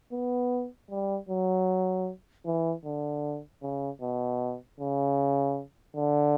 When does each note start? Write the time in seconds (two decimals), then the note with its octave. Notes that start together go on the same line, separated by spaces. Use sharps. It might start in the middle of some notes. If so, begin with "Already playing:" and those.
0.12 B3
0.90 G3
1.29 F#3
2.46 E3
2.85 D3
3.62 C#3
4.01 B2
4.80 C#3
5.96 D3